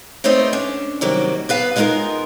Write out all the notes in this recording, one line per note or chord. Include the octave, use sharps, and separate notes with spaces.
A3 B3 C4 D#4 C5 C#5
C#4 D4
C3 D#3 F#3 G3 A#3
B3 B4 F5 A5
G3 G#3 B3 D#4 F4 A#4